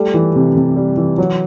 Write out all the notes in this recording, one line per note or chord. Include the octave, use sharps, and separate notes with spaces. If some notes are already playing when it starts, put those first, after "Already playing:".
Already playing: G3 A3
E3
C3
C3
G3
E3
F#3